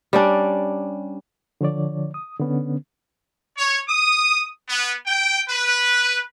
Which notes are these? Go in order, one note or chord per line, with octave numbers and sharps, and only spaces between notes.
G3 C#4 D4
D3 F3 C#5 D5
D#6
D3 B3 C#4
C#5
D#6
B3
G5
B4